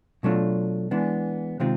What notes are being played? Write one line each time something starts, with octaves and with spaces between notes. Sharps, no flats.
B2 F#3 A3 D4 F4
E3 G#3 B3 D4
C3 D#3 G#3 C4 F4